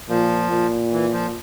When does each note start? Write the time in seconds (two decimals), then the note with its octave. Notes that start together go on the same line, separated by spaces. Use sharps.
0.09 A#2 F3
0.50 A#2
0.92 E3
1.12 F3